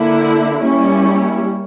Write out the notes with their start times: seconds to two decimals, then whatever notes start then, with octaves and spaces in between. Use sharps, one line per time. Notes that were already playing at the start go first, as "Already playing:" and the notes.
Already playing: D3 A#3 E4
0.60 G3 A#3 C#4 E4